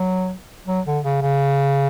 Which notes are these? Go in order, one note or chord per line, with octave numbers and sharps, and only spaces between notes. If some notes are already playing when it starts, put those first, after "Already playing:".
Already playing: F#3
F#3
D3
C#3
C#3